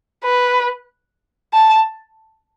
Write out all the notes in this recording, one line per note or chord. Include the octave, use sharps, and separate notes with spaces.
B4
A5